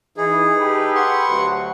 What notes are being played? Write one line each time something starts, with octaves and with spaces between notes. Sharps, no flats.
E3 D#4 G#4
G4 A4 B4
F#5 C6 C#6
D2 F#3